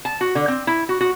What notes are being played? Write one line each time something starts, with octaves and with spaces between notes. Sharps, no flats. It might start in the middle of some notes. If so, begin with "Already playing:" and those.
A5
F#4
D3
C4
E4
F#4
F#4